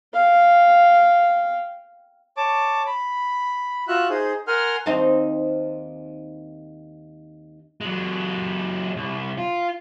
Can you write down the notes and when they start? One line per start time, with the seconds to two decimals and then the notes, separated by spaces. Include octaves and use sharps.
0.14 F5 G5
2.37 C#5 A5 D6
2.87 B5
3.88 F4 F#4 E5 F#6
4.10 D#4 G#4 C5
4.47 A#4 F#5 G#5 C6 F6
4.86 D#2 C4 D#4
7.81 F#3 G#3
8.96 C2
9.38 F4